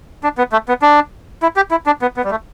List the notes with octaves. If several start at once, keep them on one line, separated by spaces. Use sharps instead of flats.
D4
B3
A3
B3
D4
E4
G4
E4
D4
B3
B3
G3
A3